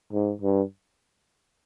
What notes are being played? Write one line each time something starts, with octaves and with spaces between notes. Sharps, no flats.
G#2
G2